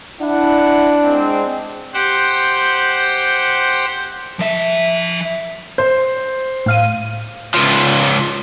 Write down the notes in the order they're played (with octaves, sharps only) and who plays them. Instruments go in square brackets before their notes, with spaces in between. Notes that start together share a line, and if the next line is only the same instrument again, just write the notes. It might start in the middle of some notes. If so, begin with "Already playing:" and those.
[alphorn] D4 [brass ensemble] E4 F#5
[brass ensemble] G#3 C4
[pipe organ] G4 C5 F#5
[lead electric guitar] F3 E5
[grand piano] C5
[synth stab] A2 F5 D#7
[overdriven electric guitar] C#2 F3